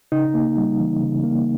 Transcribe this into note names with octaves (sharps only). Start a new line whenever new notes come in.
C#3 D#4
A#3
G3
E3
C#3
A#3